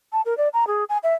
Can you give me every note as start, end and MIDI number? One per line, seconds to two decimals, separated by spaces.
0.13 0.21 81
0.26 0.36 70
0.37 0.48 74
0.53 0.67 82
0.67 0.84 68
0.89 0.98 80
1.03 1.14 76